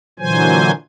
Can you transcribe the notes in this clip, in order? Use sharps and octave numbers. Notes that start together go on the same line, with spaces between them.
A#2 D3 E3 F#3 C5 G#5